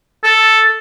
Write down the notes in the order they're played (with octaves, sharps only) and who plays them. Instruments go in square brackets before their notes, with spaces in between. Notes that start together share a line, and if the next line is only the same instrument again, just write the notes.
[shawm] A4